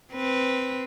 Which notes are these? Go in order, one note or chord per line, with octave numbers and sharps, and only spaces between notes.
C4 B4